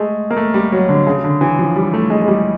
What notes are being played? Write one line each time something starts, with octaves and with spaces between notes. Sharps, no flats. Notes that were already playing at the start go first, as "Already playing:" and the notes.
Already playing: G#3 A3
A#3
A3
G3
F#3
D3
C#3
D3
E3
F3
G3
A3
G#3
G#3
G3